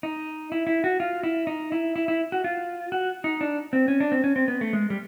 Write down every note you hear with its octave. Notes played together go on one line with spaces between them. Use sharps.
D#4
E4
E4
F#4
F4
E4
D#4
E4
E4
E4
F#4
F4
F#4
D#4
D4
C4
C#4
D4
C4
C#4
C4
B3
A3
G#3
G3